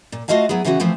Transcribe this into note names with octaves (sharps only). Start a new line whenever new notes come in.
A#2
A3 F4 F#4 D#5 F5 A5
F#3 B3 E4 G#4
C#3 E3 B3 C#4 D#4 F#4
E3 F3 A3 C4